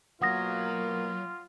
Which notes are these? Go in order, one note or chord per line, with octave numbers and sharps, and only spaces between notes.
B2 F#3 A#3 F4 F#5 D#6 A#6